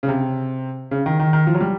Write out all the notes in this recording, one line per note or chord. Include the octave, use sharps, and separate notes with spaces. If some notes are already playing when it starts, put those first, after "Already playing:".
C#3
C3
C#3
D#3
D#3
D#3
F3
F#3
G3